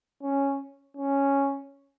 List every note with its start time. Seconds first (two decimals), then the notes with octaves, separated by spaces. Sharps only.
0.22 C#4
0.97 C#4